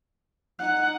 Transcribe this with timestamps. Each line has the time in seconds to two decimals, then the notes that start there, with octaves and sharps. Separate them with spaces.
0.59 D#4 F#5 F#6